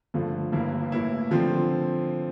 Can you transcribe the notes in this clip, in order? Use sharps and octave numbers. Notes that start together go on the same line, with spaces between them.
G2 D3 F3 A3
G1 G2 E3 A#3 E4
A2 E3 A#3 E4
D3 F3 C4